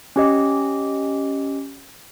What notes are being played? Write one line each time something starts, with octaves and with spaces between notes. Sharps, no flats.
C#4 G4 D#5